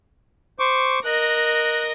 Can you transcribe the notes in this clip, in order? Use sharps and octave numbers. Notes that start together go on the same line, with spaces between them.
C5 C#6 D6
A#4 D#5 F#6